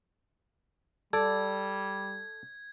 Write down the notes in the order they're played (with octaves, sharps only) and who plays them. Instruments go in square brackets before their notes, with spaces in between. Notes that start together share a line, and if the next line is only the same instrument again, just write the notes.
[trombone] G3 [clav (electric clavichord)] A4 [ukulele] D5 [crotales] G#6